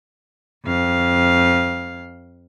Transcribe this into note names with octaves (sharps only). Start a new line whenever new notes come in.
F2 F5